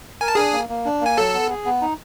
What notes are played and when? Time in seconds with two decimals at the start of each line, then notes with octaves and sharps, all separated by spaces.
0.21 A#4 G#5
0.28 A5
0.35 D4 G#4 G#5
0.53 A#3
0.69 A#3
0.85 D4
1.01 A#3 G#5
1.17 F#3 A4 A5
1.33 B3
1.50 G#4
1.65 B3
1.82 D#4